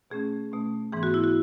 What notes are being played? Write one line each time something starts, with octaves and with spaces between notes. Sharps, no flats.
B2 A3 C#4 G#4
B2 A3 C#4
G#2 E3 B3 G#4
F#4
E4
F#4